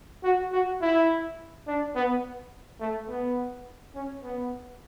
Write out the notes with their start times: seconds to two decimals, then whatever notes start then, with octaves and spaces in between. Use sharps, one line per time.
0.24 F#4
0.52 F#4
0.81 E4
1.67 D4
1.95 B3
2.80 A3
3.09 B3
3.95 C#4
4.23 B3